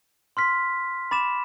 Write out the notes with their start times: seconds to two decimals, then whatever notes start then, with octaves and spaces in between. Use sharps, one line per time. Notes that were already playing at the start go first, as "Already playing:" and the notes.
0.37 C6 F6 B6
1.11 B5 D6 A6 E7